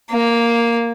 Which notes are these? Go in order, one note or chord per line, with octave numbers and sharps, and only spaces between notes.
A#3